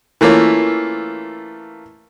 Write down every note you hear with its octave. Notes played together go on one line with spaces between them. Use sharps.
E3 A3 A#3 C#4 F4